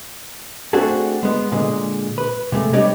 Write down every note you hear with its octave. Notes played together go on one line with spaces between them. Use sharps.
A3 C4 D4 F#4 G#4 A4
G#3 B3
A#2 D3 G#3
B4
C3 G#3 A3
G3 B3 D4 G4 C#5 D#5